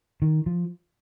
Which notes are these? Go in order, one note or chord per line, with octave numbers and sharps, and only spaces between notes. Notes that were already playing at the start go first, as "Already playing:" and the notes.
D#3
F3